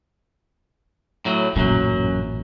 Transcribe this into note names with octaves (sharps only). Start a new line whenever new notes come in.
A2 F#3
A1 F#2 A#2 F#3